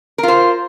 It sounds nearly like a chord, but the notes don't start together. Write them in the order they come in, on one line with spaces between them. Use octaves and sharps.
A#4 F4 C5